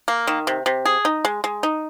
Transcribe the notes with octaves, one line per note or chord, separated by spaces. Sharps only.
A#3
D#3
C3
C3
G#4
D#4
G#3
G#3
D#4